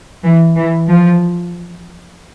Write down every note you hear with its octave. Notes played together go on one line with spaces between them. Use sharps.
E3
E3
F3